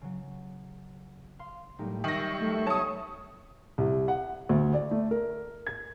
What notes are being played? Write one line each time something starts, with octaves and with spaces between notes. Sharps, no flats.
C#3 F#3
F5 C6
A2 F#3 G3 A#3 D#4
D#3 G3 E5 C#6 A#6
F#3 A3
A3 B3 C#5 A5 D#6
C2
F#5
D2
D5
A3
A#4
G#6